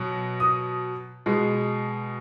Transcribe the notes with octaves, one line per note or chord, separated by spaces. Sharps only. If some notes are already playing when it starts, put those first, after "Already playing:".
Already playing: B2 F#3
D#6
B2 G#3